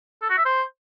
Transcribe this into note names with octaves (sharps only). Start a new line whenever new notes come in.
A4
F#4
E5
C5